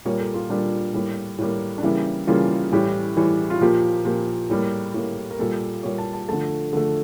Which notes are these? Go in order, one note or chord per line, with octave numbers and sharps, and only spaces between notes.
A#2 G3 A#3 C#5
A4
F4
A#2 G3 A#3 D4
A2 G3 A#3
A2 G3 A#3
D4
C#3 E3 G3 A#3 E4
C#3 E3 G3 A#3 F4
A2 E3 G3 G4
A2 E3 G3
F4
A#2 F3 A#3 G4
A#2 F3 A#3 G4
A2 G3 A#3
A2 G3 A#3
A#4
A#2 G3 A#3 A4
A#2 G3 A#3 C#5
A5
A5
D3 F3 A3 A5
D3 F3 A3